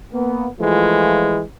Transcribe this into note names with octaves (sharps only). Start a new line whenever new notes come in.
A#3 B3
E3 F3 G#3 A3 F4